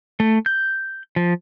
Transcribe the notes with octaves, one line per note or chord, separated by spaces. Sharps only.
A3
G6
F3